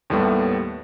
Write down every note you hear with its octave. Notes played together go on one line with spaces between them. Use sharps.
D#2 A2 G3 A3 B3